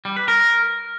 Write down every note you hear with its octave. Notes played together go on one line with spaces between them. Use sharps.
G3
B4
A#4